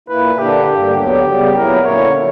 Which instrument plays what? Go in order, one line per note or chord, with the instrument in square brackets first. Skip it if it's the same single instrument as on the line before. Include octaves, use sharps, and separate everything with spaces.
[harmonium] A#2 A#3 E4 [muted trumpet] B4
[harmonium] D3 A#3 D4 [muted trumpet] G4
[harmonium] G2 D3 A#3
[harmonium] D2 D3 F#3 B3 [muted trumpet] G4
[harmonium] C#3 G3 B3
[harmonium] A#2 F#3 B3 E4 [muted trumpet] A#4
[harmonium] D3 A#3 C#4 E4 [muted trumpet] C#5
[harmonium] D3 F#3